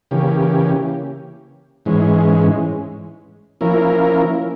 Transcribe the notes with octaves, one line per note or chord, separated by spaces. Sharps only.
C#3 E3 A#3 C#4 G4
G#2 E3 G#3 C#4
F3 A#3 C#4 E4 A#4